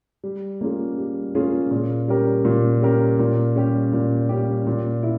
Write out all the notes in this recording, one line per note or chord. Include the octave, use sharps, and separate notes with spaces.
G3
A#3 C#4 F4 G#4
G3
A#3 C#4 F4 G#4
A#2
G3 C#4 G4 A#4
A#2
G3 C#4 G4 A#4
A#2
G3 C#4 G4
A#2
G3 C#4 G4
A#2
E4